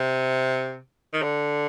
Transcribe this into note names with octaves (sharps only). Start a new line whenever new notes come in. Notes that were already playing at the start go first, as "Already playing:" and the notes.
Already playing: C3
D#3
D3